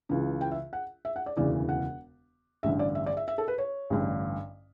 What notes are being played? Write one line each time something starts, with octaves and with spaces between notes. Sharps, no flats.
C#2 C#3 E3
G5
E5
F#5
E5
F#5
D5
E1 D2 C#3 E3 D5
F#5
A1 G2 D3 E5
D5
E5
D5
E5
E5
A4
B4
C#5
A1 G2 D3